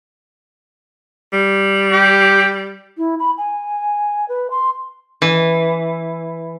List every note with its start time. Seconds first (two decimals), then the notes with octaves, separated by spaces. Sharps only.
1.33 G3
1.92 G4
2.98 E4
3.19 B5
3.38 G#5
4.29 B4
4.51 C6
5.22 E3